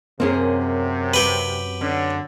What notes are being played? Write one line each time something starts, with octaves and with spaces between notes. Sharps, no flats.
F#2 C3 A#3 C4 C#4 G#4
G4 B4
D3 C#4